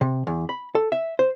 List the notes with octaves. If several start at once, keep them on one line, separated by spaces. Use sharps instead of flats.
C3
E2
B5
A4
E5
C5